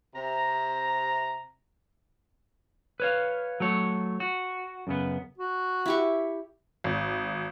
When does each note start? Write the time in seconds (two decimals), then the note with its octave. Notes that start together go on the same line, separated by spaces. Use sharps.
0.14 C3 A#5
3.00 B4 C#5 F5
3.60 F#3 A3 C#5
4.20 F#4
4.87 F#2 C#3 B3
5.38 F#4
5.86 E4 G4 C#6
6.84 G#1